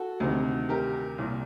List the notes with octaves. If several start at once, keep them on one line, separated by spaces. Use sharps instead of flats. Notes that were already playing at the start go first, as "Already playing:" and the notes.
Already playing: F#4 A4
D2 C3 D#3
G4 A#4
C2 A#2